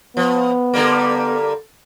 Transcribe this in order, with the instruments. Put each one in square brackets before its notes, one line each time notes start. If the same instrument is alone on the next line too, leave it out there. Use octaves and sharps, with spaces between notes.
[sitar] F3 [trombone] B3
[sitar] D3 G3 A#3